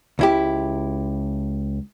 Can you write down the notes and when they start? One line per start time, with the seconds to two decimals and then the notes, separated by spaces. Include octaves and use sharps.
0.19 C#2 E4 G4